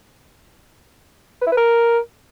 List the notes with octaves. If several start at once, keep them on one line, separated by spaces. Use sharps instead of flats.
B4
E4
B4
A#4